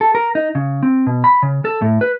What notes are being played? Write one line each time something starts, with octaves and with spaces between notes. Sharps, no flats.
A4
A#4
D#4
C#3
C4
B2
B5
C#3
A4
A2
B4